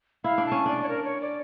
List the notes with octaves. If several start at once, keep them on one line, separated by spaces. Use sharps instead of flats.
E4 F5
D4
A5
C#4
D4 D5
C#5
A#4
C#5
D5